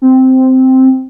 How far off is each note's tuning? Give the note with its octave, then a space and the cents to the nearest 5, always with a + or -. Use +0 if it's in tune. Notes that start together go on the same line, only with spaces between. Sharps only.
C4 -5